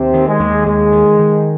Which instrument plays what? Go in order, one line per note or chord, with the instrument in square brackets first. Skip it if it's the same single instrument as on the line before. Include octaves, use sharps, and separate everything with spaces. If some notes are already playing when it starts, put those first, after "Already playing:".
Already playing: [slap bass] D#2 [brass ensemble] C3 C4
[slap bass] D#3
[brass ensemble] G#3
[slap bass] D#2
[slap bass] D#2 [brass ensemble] G#3
[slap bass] D#3
D#3